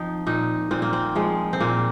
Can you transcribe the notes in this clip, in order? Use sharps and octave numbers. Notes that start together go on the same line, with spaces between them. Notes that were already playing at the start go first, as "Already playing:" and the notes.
Already playing: F3 C4 D#4
A#2 D#4
A#2 C4
A#3
C4
F3 G#3
C4
A#2 A#3